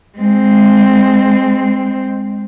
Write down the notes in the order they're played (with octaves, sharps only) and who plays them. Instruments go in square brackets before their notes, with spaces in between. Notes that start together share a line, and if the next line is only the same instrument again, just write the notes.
[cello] G#3 C4